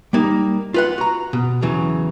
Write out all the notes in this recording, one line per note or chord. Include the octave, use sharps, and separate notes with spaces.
G3 A#3 D#4
F4 B4 F#5
F#4 A#5
B2
E2 C#3 E3 F#3